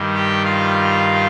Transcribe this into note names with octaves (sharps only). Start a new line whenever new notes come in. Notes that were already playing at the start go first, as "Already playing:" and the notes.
Already playing: G2 D#3 G3
G4 G5
F4 F5